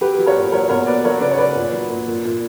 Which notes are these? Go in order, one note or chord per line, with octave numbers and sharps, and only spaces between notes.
F#3 G4 B4
F#3
A#4 C#5
A#2
F#3 A#4 C#5
B2 A#4 C#5
F#3 B4 D5
F#3 A#4 C#5
C#3 B4 D5
C#5
F#3 B4 D5
A#2
F#3
A#2
A#2
A#2